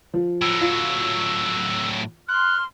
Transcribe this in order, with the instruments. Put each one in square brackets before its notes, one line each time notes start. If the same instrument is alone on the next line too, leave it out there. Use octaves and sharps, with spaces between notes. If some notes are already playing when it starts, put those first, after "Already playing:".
[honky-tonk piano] F3
[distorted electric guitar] A2 F#3 [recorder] E6
[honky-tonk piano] F4
[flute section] C6 F6 [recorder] F#6